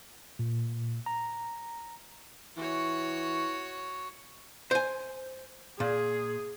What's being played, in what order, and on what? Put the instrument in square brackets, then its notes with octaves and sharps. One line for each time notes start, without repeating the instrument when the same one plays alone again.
[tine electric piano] A#2
A#5
[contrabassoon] E3 [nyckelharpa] F#4 C#5
[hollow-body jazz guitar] C5 G#5
[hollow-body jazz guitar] A#2 [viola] G#4